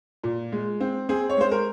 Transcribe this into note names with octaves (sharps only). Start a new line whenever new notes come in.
A#2
G#3
C4
C4 G#4
C#5
G#3 C5
A#4